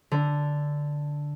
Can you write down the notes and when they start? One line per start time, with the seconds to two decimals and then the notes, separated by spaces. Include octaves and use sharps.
0.11 D3